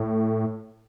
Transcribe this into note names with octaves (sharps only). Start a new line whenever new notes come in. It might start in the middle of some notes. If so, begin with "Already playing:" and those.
Already playing: A2